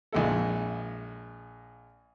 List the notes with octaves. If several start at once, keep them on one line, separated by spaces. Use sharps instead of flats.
A#1 F2 G#3 E4 A4